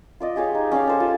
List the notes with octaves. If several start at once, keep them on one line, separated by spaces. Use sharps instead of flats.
F4 D5 D#5
G4 G#4 C#5 F5
D#4
C#4 G4 D5 F5
A4 C5 C#5
F4